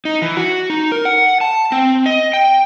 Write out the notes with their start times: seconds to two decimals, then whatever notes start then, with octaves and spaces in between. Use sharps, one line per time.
0.05 D#4
0.22 E3
0.37 F#4
0.70 D#4
0.92 A#4
1.05 F#5
1.41 A5
1.72 C4
2.06 D#5
2.33 G5